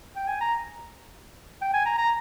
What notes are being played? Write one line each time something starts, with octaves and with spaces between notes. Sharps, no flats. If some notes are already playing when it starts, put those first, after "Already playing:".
G5
G#5
A#5
G5
G#5
A#5
A#5